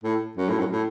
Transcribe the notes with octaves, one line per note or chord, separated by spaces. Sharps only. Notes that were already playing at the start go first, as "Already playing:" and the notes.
A2
F#2
A2
F#2
A2